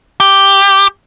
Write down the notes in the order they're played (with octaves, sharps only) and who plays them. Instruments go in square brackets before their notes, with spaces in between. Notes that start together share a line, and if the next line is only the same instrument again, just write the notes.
[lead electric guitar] G4